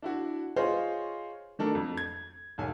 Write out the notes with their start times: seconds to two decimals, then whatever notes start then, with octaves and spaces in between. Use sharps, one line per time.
0.02 D4 E4 F#4
0.56 F4 G#4 C5 C#5 D#5 F5
1.59 D#3 F#3 A3 D4 A4 A#4
1.75 F2
1.97 G#6
2.58 E1 B1 G#5